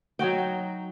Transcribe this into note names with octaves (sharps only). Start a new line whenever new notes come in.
F#3 D#4 F#4 G5